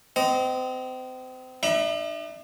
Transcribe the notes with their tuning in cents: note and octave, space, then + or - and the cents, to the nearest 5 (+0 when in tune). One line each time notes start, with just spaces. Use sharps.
C4 -30 D#5 +0
D4 +45 E5 +0 A#5 +45